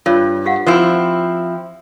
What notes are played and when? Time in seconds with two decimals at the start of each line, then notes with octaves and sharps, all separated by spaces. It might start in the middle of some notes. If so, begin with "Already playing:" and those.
0.06 G2 F4 C#5
0.46 G4 F5 F#5
0.67 F3 C4 E4 C5 G#5 C6